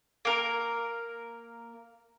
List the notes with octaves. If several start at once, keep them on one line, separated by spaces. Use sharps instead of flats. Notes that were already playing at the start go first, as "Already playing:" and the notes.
A#3 A#4